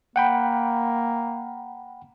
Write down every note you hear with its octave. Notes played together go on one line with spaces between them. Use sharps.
A#3 F#5 G5 B5